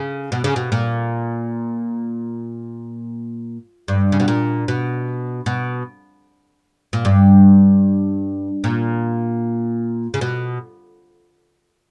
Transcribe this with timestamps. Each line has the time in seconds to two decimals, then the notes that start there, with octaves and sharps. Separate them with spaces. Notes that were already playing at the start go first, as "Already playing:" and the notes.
Already playing: C#3
0.32 B2
0.44 C#3
0.56 B2
0.72 A#2
3.88 G2
4.12 C#3
4.20 B2
4.28 A#2
4.68 B2
5.46 B2
6.93 A#2
7.05 G2
8.64 A#2
10.14 C#3
10.21 B2